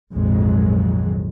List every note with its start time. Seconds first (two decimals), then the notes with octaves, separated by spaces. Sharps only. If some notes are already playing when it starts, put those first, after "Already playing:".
0.14 A#1 F2 G#2 D#3 F#3 G#3